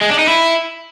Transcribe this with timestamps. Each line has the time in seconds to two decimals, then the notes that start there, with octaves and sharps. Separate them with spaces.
0.02 G#3
0.10 D4
0.19 D#4
0.28 E4